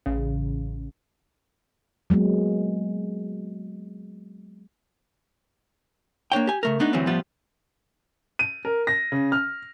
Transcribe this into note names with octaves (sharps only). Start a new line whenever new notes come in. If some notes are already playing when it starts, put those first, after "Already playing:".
A1 C#3
F#3 G#3 A#3 B3
A#3 D4 C#5 G5
G4 G#5
C#3 A3 A#4
A3 B3 D4 D#4
D2 E3 F#3 G3 C4 C#4
A2 F3 G3 B3 F4
D#7
A#4
A#6
C#3
F6